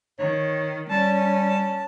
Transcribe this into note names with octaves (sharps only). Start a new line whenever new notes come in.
D#3 C#5
G3 C#4 A5